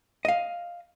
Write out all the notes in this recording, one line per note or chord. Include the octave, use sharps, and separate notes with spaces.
D#5 F5